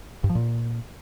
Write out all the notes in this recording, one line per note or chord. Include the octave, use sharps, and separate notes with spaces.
G2
F3
A#2